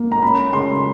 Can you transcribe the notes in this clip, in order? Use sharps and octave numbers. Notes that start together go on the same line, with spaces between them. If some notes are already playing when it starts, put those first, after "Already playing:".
Already playing: A#3
A#5
C#4 B5
C#3 C6